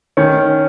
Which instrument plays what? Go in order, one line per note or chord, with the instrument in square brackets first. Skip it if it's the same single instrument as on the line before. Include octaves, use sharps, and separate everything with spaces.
[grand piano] D#3 C#4